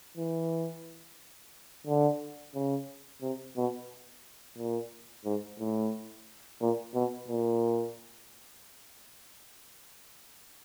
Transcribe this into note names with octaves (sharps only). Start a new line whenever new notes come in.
E3
D3
C#3
C3
B2
A#2
G#2
A2
A#2
B2
A#2